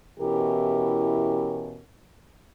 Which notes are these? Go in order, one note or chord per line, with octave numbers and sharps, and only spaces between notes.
B2 E3 C#4 E4 G4 A#4